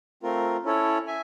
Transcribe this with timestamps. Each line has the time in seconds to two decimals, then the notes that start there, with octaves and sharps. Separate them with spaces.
0.23 A3 C4 F4 A#4
0.65 C#4 E4 A4 C#5
1.07 E5 G#5